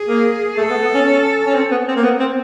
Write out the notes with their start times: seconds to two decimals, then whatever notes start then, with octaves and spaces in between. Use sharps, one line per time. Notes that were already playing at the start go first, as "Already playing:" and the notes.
Already playing: G#4
0.08 A#3
0.57 A3 A4
0.70 B3
0.82 B3
0.94 C#4
1.07 C#4
1.46 C#4
1.55 C4
1.71 B3
1.88 C4
1.96 A#3
2.04 B3
2.20 C4